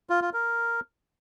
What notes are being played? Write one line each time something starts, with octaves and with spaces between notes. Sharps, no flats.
F4
F4
A#4